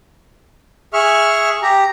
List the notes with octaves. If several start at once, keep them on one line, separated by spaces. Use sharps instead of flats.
G#4 E5 C#6 F6
G4 A#5